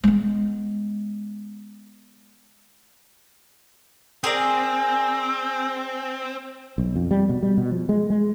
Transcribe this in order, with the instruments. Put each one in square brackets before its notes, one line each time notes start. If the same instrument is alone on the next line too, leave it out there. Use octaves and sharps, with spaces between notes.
[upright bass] G#3 B3
[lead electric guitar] C4 [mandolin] G#4 A#4 D5
[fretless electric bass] B1
F2
G3
B2
G3
B2
F3
G#3
G#3